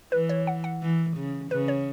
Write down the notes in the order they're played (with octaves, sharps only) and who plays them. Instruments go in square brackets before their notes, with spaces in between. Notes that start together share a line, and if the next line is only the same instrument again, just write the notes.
[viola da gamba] E3 [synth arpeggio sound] B4
[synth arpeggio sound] C#5
F#5
F#5
[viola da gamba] E3
C#3
[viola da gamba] C#3 [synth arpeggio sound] B4
[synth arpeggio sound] C#5